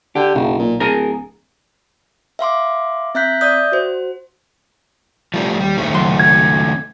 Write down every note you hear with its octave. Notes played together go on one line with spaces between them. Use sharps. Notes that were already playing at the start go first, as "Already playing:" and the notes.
D3 G4
F#1 B1
A#2
D1 G#4 A#4
E5 F5 C6 D6
C4 E5 A#5 F#6 G6 B6
D5 E5 D#6 G6
F#4 C5
F3 G3 A3
D#2 G3
D#3 A3 C4
C#2 F#3 C6
G#6